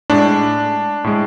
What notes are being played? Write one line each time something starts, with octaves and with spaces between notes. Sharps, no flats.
A2 G#3 D4
A2 G#3